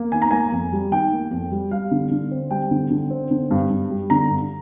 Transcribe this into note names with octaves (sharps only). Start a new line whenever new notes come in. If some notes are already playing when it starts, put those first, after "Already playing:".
Already playing: A#3
D#3 G#5
A#5
A#3 G#5
F2
G3
D#3 G5
A#3
F2
G3
G3 F5
D3
D3
C4
G3 G5
D3
D3
C4
D3
G2
G2
G3
D3 A#5
G2